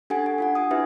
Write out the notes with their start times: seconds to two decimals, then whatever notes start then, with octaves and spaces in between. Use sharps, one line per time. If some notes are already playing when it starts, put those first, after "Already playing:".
0.10 D4 G4 A4 F#5 G#5
0.26 G#5
0.38 D4 F4 F#5
0.55 G#5 D#6
0.71 D4 E4 G4 B4 E5